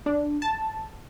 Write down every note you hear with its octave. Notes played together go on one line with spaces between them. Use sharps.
D4
A5